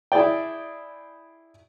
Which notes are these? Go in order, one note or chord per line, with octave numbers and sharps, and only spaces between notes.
E4 G#4 D5 G5